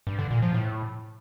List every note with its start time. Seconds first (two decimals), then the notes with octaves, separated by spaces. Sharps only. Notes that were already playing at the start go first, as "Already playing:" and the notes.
0.07 G2
0.19 D3
0.31 A#2
0.42 F3
0.54 A2